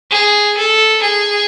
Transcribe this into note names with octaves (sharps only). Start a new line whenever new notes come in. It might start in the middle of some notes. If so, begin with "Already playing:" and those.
G#4
A4
G#4